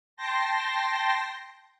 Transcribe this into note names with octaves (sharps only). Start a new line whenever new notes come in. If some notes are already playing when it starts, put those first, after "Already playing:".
G5 A5 C6 A#6